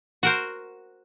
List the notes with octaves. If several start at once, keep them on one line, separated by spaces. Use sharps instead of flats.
F#4 A#4 C5